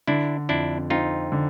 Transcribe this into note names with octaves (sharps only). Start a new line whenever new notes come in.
D3 D4 E4
F2 D4 E4
C4 D#4 F4
D3